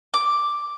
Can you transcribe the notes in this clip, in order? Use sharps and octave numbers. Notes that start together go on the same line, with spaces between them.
D6